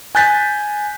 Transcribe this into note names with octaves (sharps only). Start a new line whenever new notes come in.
G#5 F#6 G6 A6 B6